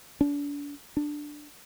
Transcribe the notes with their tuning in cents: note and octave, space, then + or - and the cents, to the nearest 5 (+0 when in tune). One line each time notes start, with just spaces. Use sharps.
D4 -35
D4 +10